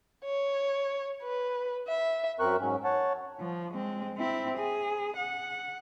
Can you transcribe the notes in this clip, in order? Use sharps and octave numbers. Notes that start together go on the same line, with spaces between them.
C#5
B4
E5
F#2 C4 A#4 C#6 F#6
G#2 F#3 C#4
C#5 F#5 A5
F3
G#3 C4
C4 E4
G#4
F#5